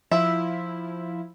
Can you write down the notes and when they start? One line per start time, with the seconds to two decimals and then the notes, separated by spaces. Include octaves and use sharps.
0.11 F3 E4 E5